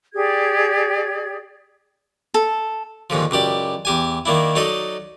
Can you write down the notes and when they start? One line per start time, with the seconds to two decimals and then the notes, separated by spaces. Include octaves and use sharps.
0.14 G4 G#4 D5 G#6
2.34 A4
3.10 D#2 G#2 D3 F3
3.31 C#2 F#2 G4 D5
3.85 E2 G4 G#5
4.25 D#3 A#3 D4 E4
4.55 F#3 D#4 A4 D5 D#5